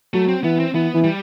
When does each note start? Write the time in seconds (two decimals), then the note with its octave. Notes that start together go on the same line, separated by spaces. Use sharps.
0.14 F#3 A3
0.28 C4
0.44 E3 B3
0.59 C4
0.74 E3 B3
0.94 E3
1.04 G3